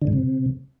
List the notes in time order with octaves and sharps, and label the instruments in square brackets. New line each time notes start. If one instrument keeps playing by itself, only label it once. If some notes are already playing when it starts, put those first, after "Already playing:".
[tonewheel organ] D3
G#2
C3